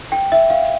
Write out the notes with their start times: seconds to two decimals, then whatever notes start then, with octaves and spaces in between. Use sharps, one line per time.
0.12 G5
0.32 E5
0.50 F5